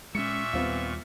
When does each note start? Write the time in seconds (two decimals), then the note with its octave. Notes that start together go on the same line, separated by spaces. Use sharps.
0.15 A#2 G#3 C#4 E5 C#6 C#7
0.53 D#2 G3 B3 C4 F4